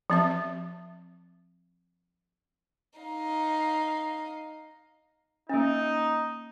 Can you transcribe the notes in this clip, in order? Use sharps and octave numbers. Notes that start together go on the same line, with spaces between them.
F3 C4 E5
D#4 F5
A#3 C#4 D#4